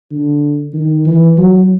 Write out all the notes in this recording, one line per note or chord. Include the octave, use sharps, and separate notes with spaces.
D3
D#3
E3
F#3